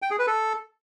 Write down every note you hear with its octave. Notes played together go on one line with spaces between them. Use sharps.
G5
G#4
B4
A4